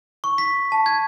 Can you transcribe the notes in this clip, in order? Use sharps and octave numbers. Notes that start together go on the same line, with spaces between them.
C#6
B6
A5
G#6